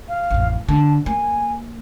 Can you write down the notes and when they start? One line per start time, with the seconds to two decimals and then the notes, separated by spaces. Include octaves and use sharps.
0.08 F5
0.31 A1 F2
0.69 D3 A5
1.06 A#3 G#5